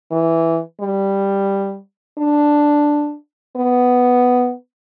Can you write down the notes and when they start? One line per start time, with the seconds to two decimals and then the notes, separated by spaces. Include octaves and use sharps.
0.12 E3
0.81 G3
2.18 D4
3.56 B3